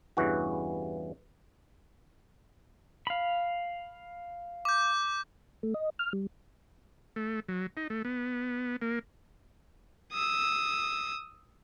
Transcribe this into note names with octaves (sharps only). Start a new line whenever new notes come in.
E2 G2 C#3 E3 F#4
F5 B5
D6 G6
A3
D#5
F6
G3
A3
F#3
D#4
A3
B3
A#3
D#6 E6